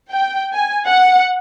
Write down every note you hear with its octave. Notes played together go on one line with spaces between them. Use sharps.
G5
G#5
F#5